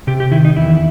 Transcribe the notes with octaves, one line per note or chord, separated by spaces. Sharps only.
C3 G4
G4
D#3 E4
D#4
E2 E4